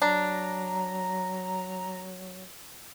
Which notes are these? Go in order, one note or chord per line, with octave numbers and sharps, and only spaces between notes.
F#3 D4 A#5